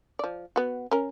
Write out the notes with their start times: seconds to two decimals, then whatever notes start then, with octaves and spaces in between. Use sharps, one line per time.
0.19 F3 D5
0.56 B3 F#4
0.91 C#4 A#4